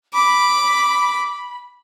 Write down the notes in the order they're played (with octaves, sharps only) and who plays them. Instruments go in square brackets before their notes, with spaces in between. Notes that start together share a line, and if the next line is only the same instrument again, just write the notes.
[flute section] B5 [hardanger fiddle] D6